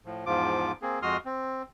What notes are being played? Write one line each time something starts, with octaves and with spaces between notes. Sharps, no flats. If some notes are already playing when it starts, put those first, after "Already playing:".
A2 F3
E2 G#2 F3 F4 D6
A#3 C4 G#4
F2 G#3 F#4 C6 D#6 F6
C4